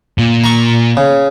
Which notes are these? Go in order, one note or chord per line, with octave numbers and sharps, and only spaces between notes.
A#2
A#5 C#6
C#3